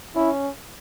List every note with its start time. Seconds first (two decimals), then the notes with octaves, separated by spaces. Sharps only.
0.16 C#4 E4